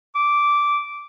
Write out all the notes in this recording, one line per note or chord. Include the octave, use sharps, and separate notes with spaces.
D6